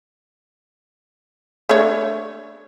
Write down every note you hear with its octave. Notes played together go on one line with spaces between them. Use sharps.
A3 D4 C#5